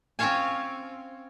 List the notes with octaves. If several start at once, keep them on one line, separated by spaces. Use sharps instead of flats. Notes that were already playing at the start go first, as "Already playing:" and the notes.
C4 C#4 F4 C#5 F5 G#5